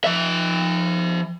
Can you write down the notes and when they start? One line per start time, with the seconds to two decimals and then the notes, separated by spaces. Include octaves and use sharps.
0.04 F3 E5